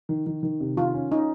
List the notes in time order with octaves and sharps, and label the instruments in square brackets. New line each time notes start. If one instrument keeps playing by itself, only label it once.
[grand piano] D#3
D#3
D#3
C3
[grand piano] D#3 [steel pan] F4
[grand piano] C#4
[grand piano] C#4 [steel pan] D#4